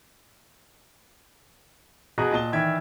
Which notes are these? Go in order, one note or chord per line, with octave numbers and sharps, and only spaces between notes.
B2 G#4 D#5 A#5 F#6
A#2 D#5 A5 G7
D#3 E3 D5 E5 G5 G#6